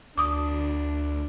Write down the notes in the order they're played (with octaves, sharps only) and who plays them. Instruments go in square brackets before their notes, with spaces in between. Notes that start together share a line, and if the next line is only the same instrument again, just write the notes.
[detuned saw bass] D2 [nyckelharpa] D4 [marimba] D6 D#6